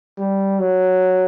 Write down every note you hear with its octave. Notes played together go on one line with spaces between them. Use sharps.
G3
F#3